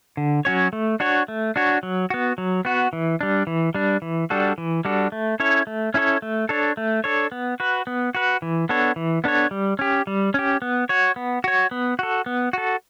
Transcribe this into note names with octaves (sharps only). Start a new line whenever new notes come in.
D3
F#3 C#4 F#4 C#5
A3
D4 F#4 C#5
A3
D4 F#4 C#5
F#3
B3 F#4
F#3
B3 F#4
E3
G3 D4
E3
G3 D4
E3
G3 D4 F#4 A4
E3
G3 D4 F#4 A4
A3
C#4 E4 A4 C#5
A3
C#4 E4 A4 C#5
A3
D4 A4 C#5
A3
D4 A4 C#5
B3
F#4 B4
B3
F#4 B4
E3
B3 D4 A4 C#5
E3
B3 D4 A4 C#5
G3
C#4 G4
G3
C#4 G4
B3
F#4 C#5
B3
F#4 C#5
B3
F#4 A4
B3
F#4 A4